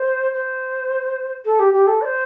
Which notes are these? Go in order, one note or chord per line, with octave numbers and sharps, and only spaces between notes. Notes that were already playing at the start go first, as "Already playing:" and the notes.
Already playing: C5
C5
A4
G4
G4
A4
D5
C5